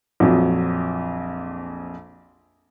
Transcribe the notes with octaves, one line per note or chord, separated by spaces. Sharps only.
A#1 F2 F#3